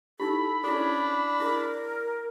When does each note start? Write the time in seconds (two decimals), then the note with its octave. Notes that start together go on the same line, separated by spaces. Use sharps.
0.20 D#4 E4 G4 A4 B5
0.64 C#4 D4 E4 G#4 A4
1.40 E4 G#4 A#4